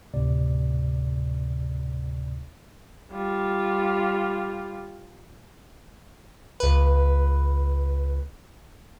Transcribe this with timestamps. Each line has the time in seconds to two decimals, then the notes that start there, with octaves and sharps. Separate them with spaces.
0.14 D2 A2 C3 D5
3.12 G3 F4
6.60 C#2 B4